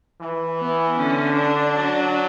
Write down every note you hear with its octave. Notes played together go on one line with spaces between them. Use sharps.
E3
B3
D3 C#4
D4
F#3